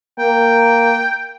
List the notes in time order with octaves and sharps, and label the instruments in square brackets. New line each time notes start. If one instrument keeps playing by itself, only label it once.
[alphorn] A#3 [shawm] G5